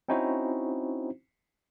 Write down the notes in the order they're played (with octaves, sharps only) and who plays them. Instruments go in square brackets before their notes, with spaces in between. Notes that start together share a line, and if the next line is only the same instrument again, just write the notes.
[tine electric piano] C4 C#4 D#4 E4 F#4 C5